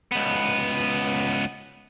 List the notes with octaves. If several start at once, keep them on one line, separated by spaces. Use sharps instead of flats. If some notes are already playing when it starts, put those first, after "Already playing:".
C#2 B3